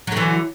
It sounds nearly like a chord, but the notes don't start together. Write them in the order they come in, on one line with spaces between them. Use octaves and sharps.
F#3 D3 E3